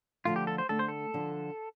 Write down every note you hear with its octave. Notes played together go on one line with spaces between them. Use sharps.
D3 F3 A3 F4
G4
A4
C5
D3 A3 D4 A4
C5
A4
D3 F3 D4